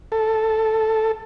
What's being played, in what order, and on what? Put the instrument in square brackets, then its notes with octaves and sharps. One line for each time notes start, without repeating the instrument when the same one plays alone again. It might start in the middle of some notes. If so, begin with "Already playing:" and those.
[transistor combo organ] A4